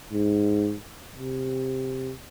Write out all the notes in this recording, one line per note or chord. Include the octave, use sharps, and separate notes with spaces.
G#2
C3